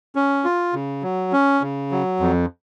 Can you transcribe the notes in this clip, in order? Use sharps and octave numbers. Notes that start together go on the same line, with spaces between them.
C#4
F4
C#3
F#3
C#4
C#3
F#3
F2